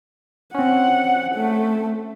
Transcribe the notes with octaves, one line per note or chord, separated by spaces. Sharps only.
C4 C#4 F#5
A3